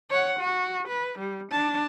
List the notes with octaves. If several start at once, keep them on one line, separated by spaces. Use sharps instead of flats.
C#5 F#5
F#4
B4
G3
D4 A5